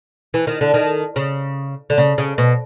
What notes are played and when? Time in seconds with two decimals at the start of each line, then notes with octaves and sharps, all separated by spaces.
0.34 E3
0.47 D#3
0.61 D3
0.74 D#3
1.16 C#3
1.90 D3
1.98 C#3
2.18 C#3
2.38 B2